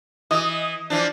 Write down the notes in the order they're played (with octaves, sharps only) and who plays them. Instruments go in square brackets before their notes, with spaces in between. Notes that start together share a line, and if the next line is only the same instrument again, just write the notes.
[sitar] E3 [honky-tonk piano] D#5 D#6
[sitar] E3 F3 D4